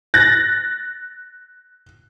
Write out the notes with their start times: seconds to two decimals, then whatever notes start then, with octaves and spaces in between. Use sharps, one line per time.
0.14 F#6 A6 A#6